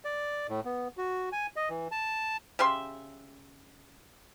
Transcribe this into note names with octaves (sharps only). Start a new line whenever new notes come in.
D5
A2
B3
F#4
G#5
D#5
E3
A5
C#3 G4 E5 C6